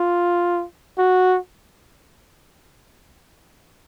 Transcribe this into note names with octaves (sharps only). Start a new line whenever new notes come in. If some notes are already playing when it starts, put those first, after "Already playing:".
Already playing: F4
F#4